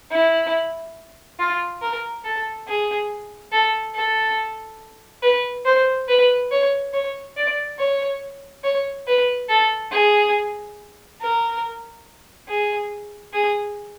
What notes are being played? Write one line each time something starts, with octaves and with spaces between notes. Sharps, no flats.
E4
F4
A#4
A4
G#4
A4
A4
B4
C5
B4
C#5
C#5
D5
C#5
C#5
B4
A4
G#4
A#4
G#4
G#4